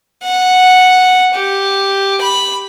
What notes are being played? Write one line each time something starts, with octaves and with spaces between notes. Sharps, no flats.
F#5
G4
B5